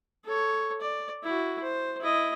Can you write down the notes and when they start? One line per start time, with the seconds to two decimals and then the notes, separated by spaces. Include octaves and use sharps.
0.25 A4 C#5
0.81 D5
1.23 E4 F#4
1.62 C5
2.00 E4 D#5